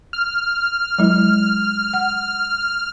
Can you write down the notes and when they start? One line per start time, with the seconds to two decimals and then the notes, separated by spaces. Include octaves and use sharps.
0.13 F6
0.98 F#3 G#3 E4
1.93 F#5